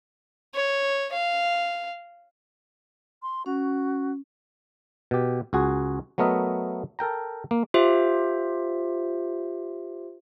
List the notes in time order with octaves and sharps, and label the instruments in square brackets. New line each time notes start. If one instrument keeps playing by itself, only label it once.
[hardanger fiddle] C#5
F5
[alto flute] C6
[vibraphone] C#4 [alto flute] F#4
[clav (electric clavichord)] B2 G4
C#2 F#4 G#4
F#3 A3 B3 A#4 D#5 E5
A4 A#4 G5 A#5
A#3
[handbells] F4 G4 C5 E5